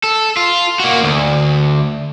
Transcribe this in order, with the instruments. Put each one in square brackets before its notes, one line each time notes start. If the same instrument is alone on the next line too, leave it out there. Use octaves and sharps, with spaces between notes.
[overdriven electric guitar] A4
F4
A#3 F#4
D2